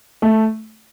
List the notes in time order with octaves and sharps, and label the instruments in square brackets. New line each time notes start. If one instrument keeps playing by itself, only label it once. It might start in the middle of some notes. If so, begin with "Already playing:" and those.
[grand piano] A3